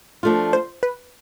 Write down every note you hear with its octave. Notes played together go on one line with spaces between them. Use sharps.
F3 A3 D4 F4
C5
B4